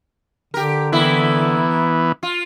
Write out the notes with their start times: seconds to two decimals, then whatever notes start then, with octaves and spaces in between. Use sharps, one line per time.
0.54 D3 G4 A#4
0.92 E3 A#3 B3 E4
2.23 F4